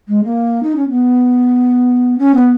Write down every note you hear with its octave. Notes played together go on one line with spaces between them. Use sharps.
G#3
A#3
D#4
C#4
B3
C#4
B3